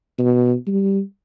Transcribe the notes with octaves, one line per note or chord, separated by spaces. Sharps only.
B2
G3